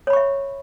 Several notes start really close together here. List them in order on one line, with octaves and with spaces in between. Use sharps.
C#5 B5 C#6 E5